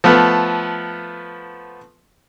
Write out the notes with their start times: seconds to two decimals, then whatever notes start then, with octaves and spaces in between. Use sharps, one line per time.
0.04 F3 A3 B3